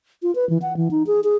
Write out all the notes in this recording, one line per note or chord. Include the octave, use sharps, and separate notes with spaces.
F4
B4
E3
F#5
E3
D#4
G#4
G#4